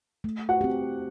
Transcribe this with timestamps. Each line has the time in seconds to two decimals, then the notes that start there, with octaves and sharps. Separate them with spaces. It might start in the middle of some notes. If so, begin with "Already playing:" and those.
0.24 A3
0.49 F#4 F#5
0.61 C4 G4